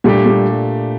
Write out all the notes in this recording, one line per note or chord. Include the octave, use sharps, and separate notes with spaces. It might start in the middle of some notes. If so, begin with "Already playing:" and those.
A#2 G3 A3 D4 G4
G3